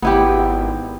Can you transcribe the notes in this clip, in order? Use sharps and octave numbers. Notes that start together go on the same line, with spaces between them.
G#1 B3 E4 G4